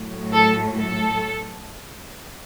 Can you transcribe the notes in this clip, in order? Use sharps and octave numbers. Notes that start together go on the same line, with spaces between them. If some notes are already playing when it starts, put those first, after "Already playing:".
Already playing: A2 F#3
A4
A4